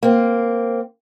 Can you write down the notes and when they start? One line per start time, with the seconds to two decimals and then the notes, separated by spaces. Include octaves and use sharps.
0.03 A#3 C4